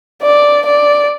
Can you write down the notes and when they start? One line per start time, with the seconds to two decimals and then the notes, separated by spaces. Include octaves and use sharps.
0.22 D5
0.66 D5